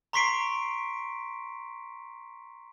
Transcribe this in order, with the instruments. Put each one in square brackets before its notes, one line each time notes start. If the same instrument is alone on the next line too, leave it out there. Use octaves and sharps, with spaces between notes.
[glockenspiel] A#5 C6 C#6 B6 C7 D7